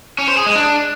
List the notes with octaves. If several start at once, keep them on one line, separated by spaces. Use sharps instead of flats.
C#4
C5
G#4
G#3
D4